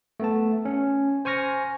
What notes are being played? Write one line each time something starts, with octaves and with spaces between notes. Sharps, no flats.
A3 B3 A5
C#4
C5 G#5 C#6 F6 A#6